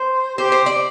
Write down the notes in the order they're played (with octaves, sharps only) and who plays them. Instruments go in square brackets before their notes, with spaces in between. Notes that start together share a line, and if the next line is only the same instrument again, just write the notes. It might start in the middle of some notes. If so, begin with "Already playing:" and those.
Already playing: [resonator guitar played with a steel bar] C5
[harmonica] G4 [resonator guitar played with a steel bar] C5
[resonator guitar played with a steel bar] C5
D5